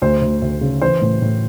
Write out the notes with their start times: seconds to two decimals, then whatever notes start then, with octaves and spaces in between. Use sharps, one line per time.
0.02 D2 C5
0.22 D2
0.42 D2
0.61 C#3
0.81 E3 C5
1.01 A2
1.21 A2